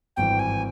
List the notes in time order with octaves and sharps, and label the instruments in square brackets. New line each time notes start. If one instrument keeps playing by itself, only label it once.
[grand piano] G#1 G2 E3 [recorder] G5
[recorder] G#5